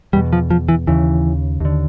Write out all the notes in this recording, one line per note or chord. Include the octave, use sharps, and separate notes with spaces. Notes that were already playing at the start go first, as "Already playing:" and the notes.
E2 B2 G3
F3
F3
E3
D#2 C#3 E3
D#2 D3